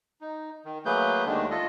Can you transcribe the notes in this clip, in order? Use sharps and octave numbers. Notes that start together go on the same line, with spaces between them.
D#4
D#3
F#3 A3 A#3 G#4 B4 G6
D#2 D3 D#3 G#3 A3 D4
F4 A4 D#5